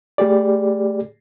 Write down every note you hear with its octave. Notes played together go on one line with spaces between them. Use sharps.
A3 G4 G#4 D5